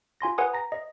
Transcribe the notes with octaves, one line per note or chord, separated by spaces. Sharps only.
F4 G#5 C6 A#6
B4 F#5 G#5 D#6
A#5 A#6
D#5